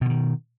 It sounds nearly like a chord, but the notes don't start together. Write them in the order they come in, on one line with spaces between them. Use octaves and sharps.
B2 D3 D#3